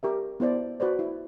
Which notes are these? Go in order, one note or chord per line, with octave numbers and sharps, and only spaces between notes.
G4 A#4 E5
B3 E4 C5 D5
F#4 B4 C5 D5
E4